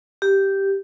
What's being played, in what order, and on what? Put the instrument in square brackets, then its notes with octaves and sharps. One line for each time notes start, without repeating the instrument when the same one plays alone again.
[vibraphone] G4